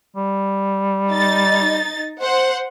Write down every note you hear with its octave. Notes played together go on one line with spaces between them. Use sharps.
G3
D#4 A6
C5 F#5